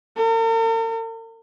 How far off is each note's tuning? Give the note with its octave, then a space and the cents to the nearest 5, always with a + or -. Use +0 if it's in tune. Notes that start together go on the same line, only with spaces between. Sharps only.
A#4 -45